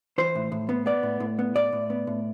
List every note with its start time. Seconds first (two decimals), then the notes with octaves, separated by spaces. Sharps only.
0.18 E3 C5
0.35 A2
0.52 A2
0.69 B3
0.86 B3 D5
1.03 A2
1.20 A2
1.39 B3
1.55 A2 D5
1.72 A2
1.90 B3
2.07 A2